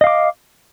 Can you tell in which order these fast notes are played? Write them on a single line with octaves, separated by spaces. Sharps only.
D#5 F5 D6